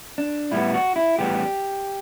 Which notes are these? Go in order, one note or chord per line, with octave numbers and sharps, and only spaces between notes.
D4
A2 G3 B3 E4
F#4
E4
A2 E3 G3 B3 G4